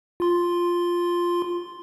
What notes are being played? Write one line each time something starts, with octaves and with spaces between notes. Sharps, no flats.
F4 C6